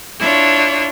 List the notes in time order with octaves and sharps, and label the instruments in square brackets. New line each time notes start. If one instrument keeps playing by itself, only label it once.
[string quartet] D4 E4 F4 C#5